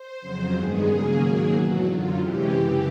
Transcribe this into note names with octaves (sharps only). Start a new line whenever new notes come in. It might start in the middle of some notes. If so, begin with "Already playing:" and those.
Already playing: C5
F2 C#3 F#3
G2 D#3 G#3 B3 G#4
D#2 C#3 F#3 A#3 C#4
G#2 D#3 F#3 A#3
E2 B2 F#3 F#4
F#2 D3 F#3 F4
C3 E3 G#3 C#4 G4
F#2 C#3 E3 G4